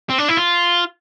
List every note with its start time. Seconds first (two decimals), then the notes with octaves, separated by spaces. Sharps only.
0.10 C4
0.18 D4
0.28 E4
0.37 F4